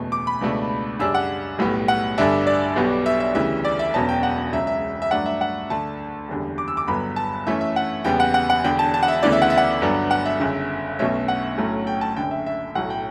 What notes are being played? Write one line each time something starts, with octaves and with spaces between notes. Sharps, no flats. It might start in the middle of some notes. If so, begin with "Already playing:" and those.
Already playing: F#1 E2 B2 A3
D6
B5
C#2 B2 A3 D4
F#2 C#3 G3 D4 E6
F#5
B1 A2 G3 B3
F#5
G1 G2 D3 G3 D4 E5
D5
B1 B2 G3 B3
E5
E5
D2 C#3 E3 G3 E5
D5
E5
E1 E2 B2 F#3 C#4 A5
G5
F#5
C#2 C#3 F#3 E5
E5
E5
G2 F#3 A3 D4 F#5
E5
F#5
D2 D3 A3 D4 A5
F#1 E2 D3 G3
D6
E6
D6
G1 G2 F#3 B3 B5
A5
F#2 E3 A3 C#4 E5
E5
F#5
F#1 E2 C#3 G3 B3 G5
F#5
F#5
F#5
E1 E2 D3 G5
A5
A5
F#5
E5
D2 C#3 E3 B3 D5
E5
F#5
E5
F#5
G1 G2 F#3 B3 D4
F#5
E5
G1 F#2 C#3
B1 B2 A3 C#4 E5
F#5
B1 A2 F#3 A3 C#4
G5
A5
F#1 F#2 D3 G5
E5
E5
B1 A2 F#3 A3 F#5
G5